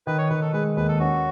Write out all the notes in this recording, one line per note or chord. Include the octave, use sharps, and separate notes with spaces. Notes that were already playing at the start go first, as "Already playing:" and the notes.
D#3 B4
C#5
D#3 B4
A4
G#3 B4
D#2 B4
A4
C#4 F#4